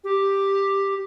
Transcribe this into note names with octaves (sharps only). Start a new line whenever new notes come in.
G4